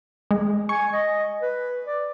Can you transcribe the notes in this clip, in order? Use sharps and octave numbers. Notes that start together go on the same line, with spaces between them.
G#3
G#5 C#6
D#5
B4
D5